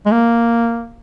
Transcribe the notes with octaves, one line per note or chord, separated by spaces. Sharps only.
G#3
A#3